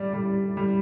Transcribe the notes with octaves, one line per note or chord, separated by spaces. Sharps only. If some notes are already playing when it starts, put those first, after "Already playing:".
Already playing: G3 D5
G3
G3